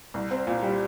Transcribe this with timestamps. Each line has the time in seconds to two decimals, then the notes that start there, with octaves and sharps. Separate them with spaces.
0.14 C2
0.31 C4
0.47 A#2
0.63 G3